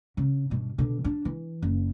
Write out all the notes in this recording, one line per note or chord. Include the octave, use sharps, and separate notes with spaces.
C#3
G2 B2
B2 D3
D4
E3
F#1